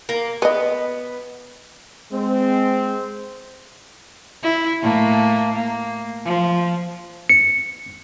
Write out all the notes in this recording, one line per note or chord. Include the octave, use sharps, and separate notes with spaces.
A#3
B3 B4 D#5
G#3 C4
E4
A2 A3 A#3
A#3
F3
C#7